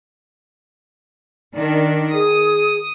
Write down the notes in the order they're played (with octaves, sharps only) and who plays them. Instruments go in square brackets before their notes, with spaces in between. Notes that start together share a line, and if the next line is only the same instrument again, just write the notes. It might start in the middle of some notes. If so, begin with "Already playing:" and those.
[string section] D#3 D4
[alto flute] G#4 [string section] D#6